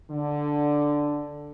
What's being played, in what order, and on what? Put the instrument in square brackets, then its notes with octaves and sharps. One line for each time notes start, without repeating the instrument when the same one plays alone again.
[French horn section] D3